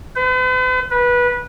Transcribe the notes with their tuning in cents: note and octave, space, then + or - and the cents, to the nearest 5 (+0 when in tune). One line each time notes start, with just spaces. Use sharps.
B4 +45
B4 -20